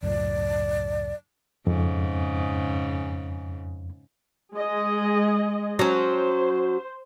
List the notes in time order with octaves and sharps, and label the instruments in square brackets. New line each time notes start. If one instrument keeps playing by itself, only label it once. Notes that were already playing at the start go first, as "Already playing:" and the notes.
[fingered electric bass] C#2 F#2 A2 [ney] D5
[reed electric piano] F2 [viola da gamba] G#2 C#3
[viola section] G#3 G#4 D#5
[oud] F#3 C#4 [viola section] C5